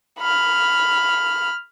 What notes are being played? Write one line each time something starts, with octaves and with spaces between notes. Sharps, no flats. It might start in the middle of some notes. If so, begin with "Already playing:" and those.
B5 F6